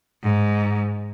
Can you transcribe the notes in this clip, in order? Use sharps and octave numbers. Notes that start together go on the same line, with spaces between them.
G#2